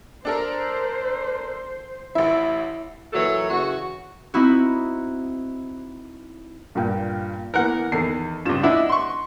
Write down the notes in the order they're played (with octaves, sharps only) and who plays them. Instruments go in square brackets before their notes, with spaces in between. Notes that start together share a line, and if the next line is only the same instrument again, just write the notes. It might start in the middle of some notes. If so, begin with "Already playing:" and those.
[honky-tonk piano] D4 A4 A#4 [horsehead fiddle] C5
[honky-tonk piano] A1 E5 [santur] E4 D6
[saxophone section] A#2 E3 F#3 A4 C#5
C#3 E3 F#4
[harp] C4 D#4 E4 F#4
[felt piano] G2 A#2 G5
[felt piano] E3 A#3 B3 [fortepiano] A#4 F#5
[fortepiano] E2 [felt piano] D#3 A4 C7
[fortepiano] C#2 G2 [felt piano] F4 E7
[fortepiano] D4 E4 [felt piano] D#5 F#5
[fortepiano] C6 C#6